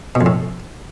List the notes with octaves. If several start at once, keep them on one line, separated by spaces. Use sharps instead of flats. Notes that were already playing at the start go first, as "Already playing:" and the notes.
B2
F2
A2